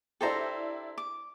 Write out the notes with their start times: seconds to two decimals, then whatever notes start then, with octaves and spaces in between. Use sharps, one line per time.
0.21 D4 E4 G4 A4 C5 A#5
0.98 D6